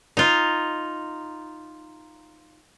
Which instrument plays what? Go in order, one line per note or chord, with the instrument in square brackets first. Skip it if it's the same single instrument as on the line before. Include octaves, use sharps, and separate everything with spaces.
[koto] D#4 F4